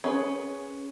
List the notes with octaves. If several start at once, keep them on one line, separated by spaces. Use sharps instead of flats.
C#4 G#4 B4